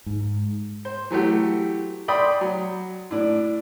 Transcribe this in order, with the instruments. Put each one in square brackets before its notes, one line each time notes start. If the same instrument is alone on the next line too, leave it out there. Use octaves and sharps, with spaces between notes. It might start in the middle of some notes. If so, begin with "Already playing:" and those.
[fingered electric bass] G#2
[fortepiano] C5
E3 F#3 A3 G4
D5 G5 B5 C6 D#6
F#3
A2 D4